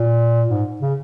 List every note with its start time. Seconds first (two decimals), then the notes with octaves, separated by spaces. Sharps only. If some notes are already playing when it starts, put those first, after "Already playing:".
Already playing: A#2
0.49 G#2
0.81 C#3